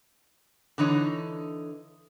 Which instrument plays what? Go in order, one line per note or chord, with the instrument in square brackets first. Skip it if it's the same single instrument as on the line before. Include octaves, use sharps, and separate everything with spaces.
[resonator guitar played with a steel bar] D3 E3 D#4 C#5